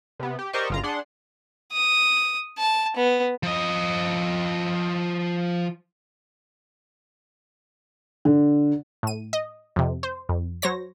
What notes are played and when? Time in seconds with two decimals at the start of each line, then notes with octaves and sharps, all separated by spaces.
0.20 C3 B3
0.39 G4
0.53 G4 A#4 C5 D5 D#5 C#6
0.70 G1 F4 A#5
0.83 D4 G#4 F#5 C6
1.72 D#6
2.58 A5
2.96 B3
3.43 F3 D#5
8.25 D3
9.03 A2 D#7
9.33 D#5
9.76 F2 C3
10.03 C5
10.29 F2
10.62 F#3 C5 C#5 A#6